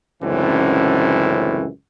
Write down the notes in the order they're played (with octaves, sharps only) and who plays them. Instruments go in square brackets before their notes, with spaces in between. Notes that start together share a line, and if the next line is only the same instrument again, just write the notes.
[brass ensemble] C#2 F#2 A2 D3 E3 C4